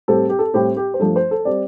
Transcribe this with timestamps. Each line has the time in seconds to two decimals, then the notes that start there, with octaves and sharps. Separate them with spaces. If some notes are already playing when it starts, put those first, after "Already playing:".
0.08 A2 G3 C4 A4
0.29 G4
0.39 A4
0.54 A2 G3 C4 G4
0.77 G4
0.94 C5
0.99 G2 F3 A3 A4
1.16 C5
1.31 A4
1.45 G3 C4 D5